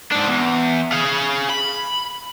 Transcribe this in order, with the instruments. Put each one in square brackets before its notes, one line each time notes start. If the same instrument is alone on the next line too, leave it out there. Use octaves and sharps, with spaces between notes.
[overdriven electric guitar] G#2 D4
E2
G#4 F5
B5